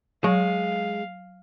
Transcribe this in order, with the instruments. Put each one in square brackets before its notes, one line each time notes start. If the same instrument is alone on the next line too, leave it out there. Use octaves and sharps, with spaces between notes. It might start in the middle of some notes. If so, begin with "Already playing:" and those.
[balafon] F#3 [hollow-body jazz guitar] G#3 [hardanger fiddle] F5